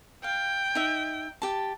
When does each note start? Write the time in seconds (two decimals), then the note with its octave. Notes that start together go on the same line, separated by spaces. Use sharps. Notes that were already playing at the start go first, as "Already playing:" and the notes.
0.24 F5 G5
0.75 D#4 E5
1.42 G4 A5